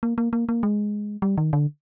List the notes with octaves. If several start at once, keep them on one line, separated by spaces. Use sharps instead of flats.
A#3
A#3
A#3
A#3
G#3
G3
D#3
D3